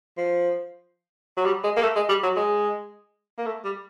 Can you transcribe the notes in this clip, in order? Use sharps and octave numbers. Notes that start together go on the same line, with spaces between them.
F3
F#3
G3
G#3
A#3
A3
G#3
G3
F#3
G#3
A#3
A3
G3